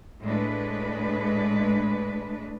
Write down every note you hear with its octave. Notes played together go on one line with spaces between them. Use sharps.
A2 G#3 D4 B4